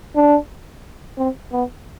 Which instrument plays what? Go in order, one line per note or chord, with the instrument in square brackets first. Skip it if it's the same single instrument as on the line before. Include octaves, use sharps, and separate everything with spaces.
[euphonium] D4
C4
B3